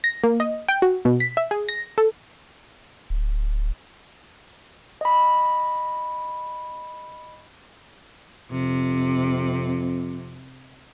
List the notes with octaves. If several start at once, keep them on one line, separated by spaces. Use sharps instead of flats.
A#6
A#3
D#5
G5
F#4
B2
B6
E5
G#4
A#6
A4
D1
D#5 B5
F2 C3